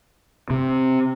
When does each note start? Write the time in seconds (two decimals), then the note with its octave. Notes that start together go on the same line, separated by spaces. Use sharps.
0.50 C3